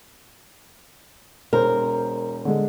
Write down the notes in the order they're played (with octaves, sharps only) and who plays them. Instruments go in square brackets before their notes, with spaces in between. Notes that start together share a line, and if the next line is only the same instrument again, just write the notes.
[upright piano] E1 C5 [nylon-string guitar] A#4
[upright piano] D3 G#3